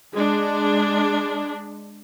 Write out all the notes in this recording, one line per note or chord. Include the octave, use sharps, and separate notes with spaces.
G#3 D4